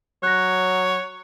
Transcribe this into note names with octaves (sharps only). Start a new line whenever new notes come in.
F#3 C#5 F#6 A#6